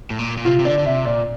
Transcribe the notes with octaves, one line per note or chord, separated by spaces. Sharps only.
A2
A#2
A#2
C3 F4
C3
D3 D5
D3
C3 E5
A#2 D5